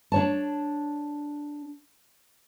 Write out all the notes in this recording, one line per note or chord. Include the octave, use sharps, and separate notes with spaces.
D4 C#5 A5